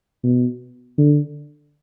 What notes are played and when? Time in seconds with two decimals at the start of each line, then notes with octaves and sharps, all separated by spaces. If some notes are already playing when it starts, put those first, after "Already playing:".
0.23 B2
0.98 D3